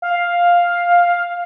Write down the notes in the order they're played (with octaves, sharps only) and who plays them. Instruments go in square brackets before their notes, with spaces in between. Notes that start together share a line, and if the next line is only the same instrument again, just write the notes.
[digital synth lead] F5